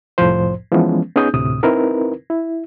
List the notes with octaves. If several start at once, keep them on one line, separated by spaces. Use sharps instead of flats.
C2 F2 A2 F3 C5
E3 F3 G#3 B3 C#4
B3 C#4 D#4 G#4 D#6 G6
D2 A2 C3 D#6
C4 D#4 E4 A#4 B4
E4